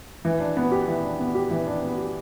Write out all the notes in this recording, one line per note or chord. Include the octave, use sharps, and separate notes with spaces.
E3
D4
B3
G4
E3
D4
B3
G4
E3
D4
B3
G4